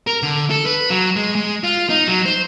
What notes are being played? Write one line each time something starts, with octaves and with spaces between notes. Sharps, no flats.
A#4
D3
A4
B4
F#3
G#3
G#3
F4
D#4
F#3
C5